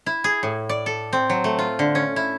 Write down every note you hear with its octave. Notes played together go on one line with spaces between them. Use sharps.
E4
G#4
A2
D5
A4
C4
F#3
A3
F4
D3
C#4
E4